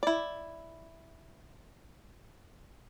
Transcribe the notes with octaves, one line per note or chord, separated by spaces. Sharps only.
E4 D5